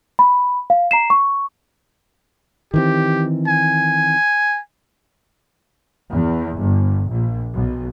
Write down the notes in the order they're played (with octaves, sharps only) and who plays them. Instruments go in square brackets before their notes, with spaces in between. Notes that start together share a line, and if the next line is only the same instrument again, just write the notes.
[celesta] B5
F5
A#5 C7 E7
C#6
[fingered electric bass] D#3 E3 C4 [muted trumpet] G4
[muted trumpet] G#5
[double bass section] E2
G1
A#1
B1